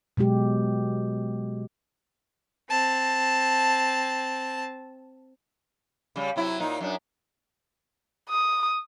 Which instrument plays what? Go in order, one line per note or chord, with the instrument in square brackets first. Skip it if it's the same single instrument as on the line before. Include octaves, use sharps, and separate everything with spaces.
[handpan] B2 F#3 G#3 G4
[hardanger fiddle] C4 A5
[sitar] C#3 G3
C3 F#3 E4
A#2 D#4
F#2 D4
[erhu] D#6